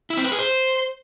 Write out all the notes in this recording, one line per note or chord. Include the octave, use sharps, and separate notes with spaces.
E4
C4
B4
G#4
C5